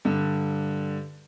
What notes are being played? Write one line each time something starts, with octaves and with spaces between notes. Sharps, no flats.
G2 D3